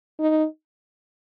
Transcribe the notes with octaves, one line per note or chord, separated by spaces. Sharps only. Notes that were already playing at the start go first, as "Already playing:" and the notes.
D#4